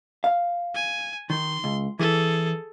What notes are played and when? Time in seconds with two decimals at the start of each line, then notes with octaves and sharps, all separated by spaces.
0.24 F5
0.75 G#5
1.30 D#3 C6
1.64 C#2
1.99 E3 G#4 A4